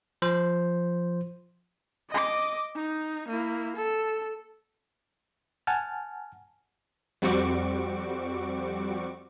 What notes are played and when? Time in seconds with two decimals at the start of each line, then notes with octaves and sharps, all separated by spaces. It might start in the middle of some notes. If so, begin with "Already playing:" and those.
0.22 F3 C5
2.10 D#5 D6
2.76 D#4
3.28 A#3 E4
3.77 A4
5.67 F#5 G#5 A5 F6
7.22 F2 G3 C4 F#4 C#6 D6